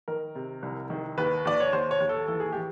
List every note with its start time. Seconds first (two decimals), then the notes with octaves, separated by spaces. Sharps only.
0.08 D#3 A#4
0.35 C3
0.63 C2
0.90 D#3
1.18 D#2 B4
1.45 D#2 D5
1.60 C#5
1.73 D#2 C5
1.91 C#5
2.00 D#2
2.09 A4
2.28 E3 A4
2.40 G#4
2.53 E3 G4